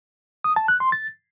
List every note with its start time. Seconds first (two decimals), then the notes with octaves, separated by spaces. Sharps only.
0.44 D#6
0.56 A5
0.68 F#6
0.80 C6
0.92 A6